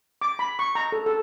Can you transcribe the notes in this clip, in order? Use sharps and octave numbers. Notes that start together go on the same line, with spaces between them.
D6
B5
C#6
A#5
A4
A4